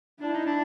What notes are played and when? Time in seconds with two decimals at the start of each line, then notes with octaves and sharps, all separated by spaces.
0.21 D4 E4
0.32 D#4
0.45 D4